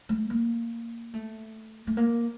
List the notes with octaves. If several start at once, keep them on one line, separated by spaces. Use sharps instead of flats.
A3
A#3
A3
A3
A#3